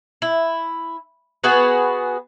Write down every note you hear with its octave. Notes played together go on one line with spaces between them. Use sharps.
E4
B3 F#4 G#4 B4